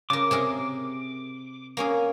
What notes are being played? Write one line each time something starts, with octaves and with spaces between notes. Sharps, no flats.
C#3 A#4 D6
C3 G#4 A#4
A#3 C#4 G#4